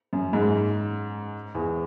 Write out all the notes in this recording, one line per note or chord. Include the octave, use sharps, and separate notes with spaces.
F#2
G#2
E2